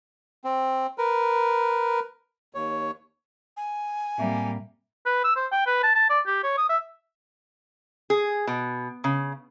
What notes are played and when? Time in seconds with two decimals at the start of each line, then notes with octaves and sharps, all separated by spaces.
0.45 C4
0.98 A#4 B4
2.55 D#2 C#5
3.57 G#5
4.18 A2 G3 A#3 C4 E5
5.06 B4
5.24 E6
5.36 C5
5.52 G5
5.66 B4
5.83 A5
5.95 A5
6.09 D5
6.26 G4
6.43 C#5
6.57 D#6
6.69 E5
8.10 G#4
8.47 B2
9.04 C#3